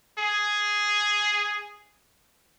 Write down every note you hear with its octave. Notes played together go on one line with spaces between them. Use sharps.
G#4